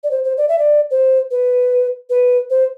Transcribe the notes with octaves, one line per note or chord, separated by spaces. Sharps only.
D5
C5
C5
D5
E5
D5
C5
B4
B4
C5